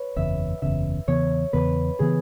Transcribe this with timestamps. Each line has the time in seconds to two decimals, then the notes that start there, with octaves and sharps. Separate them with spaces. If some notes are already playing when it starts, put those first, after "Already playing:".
Already playing: B4 C#5
0.16 F#1 E2 C#3 E5
0.62 F#1 E2 C#3 E5
1.08 E2 C#3 E3 B3 C#5
1.53 E2 C#3 E3 B3 B4
1.99 C#3 E3 B3 G#4